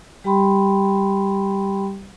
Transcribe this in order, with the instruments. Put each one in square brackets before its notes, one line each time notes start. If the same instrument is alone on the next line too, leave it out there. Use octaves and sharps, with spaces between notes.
[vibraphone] G3 G4 G5 B5 C6